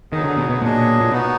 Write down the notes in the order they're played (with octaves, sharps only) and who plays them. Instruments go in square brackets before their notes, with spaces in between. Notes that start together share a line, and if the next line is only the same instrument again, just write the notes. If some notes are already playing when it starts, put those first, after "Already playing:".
[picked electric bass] D#3 [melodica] F#3 B3 D#4 G#4
[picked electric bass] D3
B2
B2
[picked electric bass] A#2 [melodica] F#3 D4 G#4 D#5
[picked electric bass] A#2
[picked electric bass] B2 [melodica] B3 D#4 F#4